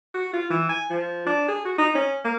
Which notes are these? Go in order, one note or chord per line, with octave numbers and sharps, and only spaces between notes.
F#4
F4
E3
G#5
F3
D4
G#4
F#4
D#4
C#4
A#3